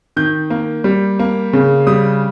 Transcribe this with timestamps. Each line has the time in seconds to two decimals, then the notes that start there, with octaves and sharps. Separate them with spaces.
0.17 D#3 G6
0.50 A#3
0.84 G3
1.19 A#3
1.53 C#3
1.87 G3 D#6